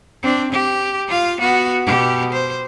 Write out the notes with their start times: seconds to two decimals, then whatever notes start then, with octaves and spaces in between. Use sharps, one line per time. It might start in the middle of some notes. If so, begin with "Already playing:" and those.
0.23 C4 D4
0.52 G4
1.08 F4 F5
1.41 B3 F#4
1.86 B2 G4
2.33 C5